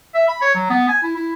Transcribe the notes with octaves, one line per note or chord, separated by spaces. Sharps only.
E5
B5
C#5
F#3
B3
G#5
E4
E4